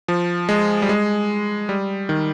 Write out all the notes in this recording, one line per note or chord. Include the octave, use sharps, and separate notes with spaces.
F3
G#3
G3
G#3
G3
D#3